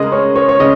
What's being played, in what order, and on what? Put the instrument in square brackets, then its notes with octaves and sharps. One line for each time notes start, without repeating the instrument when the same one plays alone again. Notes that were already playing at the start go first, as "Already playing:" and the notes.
Already playing: [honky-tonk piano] C#3 G#3 A#4 [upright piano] D#5
[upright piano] C#5
C#5
C#5
[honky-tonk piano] C#3 [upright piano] D#5